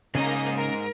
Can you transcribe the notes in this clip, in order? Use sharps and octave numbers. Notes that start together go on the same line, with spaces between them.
G#2 C#3 A#3 D#4 D#5 G#5
A#4